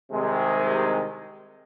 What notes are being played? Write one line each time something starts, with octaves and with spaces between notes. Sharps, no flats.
C2 C3 D#3 G#3